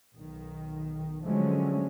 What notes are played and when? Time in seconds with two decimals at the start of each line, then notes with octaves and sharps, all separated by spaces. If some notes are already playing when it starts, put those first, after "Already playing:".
0.15 B1 D#3
1.23 D3 F3 F#3 G#3 A3 C#4